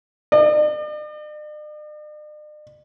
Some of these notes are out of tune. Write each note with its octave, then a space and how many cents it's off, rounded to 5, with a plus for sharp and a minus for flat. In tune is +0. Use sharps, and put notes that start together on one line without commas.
D5 +45